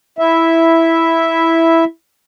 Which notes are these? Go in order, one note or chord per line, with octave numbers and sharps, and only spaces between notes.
E4 E5